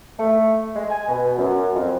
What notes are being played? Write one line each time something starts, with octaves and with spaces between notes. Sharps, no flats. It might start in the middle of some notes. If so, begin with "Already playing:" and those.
A3
G#3
G#5
B2
F#2
F2